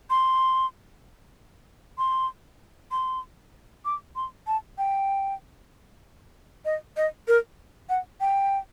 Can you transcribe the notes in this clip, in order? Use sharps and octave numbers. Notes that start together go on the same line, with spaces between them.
C6
C6
C6
D6
C6
A5
G5
D#5
D#5
A#4
F#5
G5